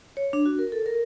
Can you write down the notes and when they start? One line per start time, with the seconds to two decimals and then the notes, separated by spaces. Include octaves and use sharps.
0.17 C#5
0.33 D4
0.46 F#4
0.59 A#4
0.72 A4
0.86 A#4